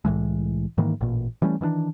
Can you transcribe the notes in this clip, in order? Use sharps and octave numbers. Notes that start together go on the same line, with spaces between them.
C2 A2 E3 G#3
G#2 D#3 E3 A#3
A1 A#2
E3 G3 A3 C#4
D#3 E3 A#3 D4